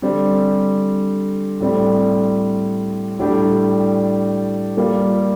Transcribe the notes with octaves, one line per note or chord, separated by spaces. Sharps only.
D3 G3 C4
A2 G3 C4
A2 G3 D4 G4
G3 A#3 F4